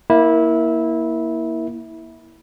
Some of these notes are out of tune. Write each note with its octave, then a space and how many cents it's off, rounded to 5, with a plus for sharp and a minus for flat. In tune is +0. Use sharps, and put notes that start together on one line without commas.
A#3 +15 E4 -15